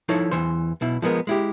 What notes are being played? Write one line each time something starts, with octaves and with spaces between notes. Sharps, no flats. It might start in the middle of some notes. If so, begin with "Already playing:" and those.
F3 D#4 E4 A4 C#5
E2 A2 E3 C5
B1 B2 E4
F3 G#3 B3 A4 A#4
G#3 E4 G4